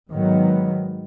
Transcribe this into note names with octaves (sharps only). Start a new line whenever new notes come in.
G#2 D#3 F#3 B3